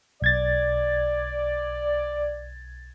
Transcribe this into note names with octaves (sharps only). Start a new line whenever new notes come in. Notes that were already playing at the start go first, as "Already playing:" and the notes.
B1 D5 G#6 A6